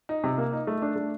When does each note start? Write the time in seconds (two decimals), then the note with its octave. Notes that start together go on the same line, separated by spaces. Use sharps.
0.09 D#4
0.24 C3
0.38 A#3
0.53 D#4
0.67 A3
0.82 D4
0.96 A3